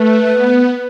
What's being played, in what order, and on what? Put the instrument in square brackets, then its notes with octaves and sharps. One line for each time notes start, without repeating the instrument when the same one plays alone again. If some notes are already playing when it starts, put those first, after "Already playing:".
Already playing: [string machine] A3 [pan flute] B4
[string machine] B3